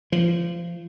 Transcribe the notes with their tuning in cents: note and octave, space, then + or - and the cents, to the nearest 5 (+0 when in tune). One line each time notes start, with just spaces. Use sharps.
F3 -25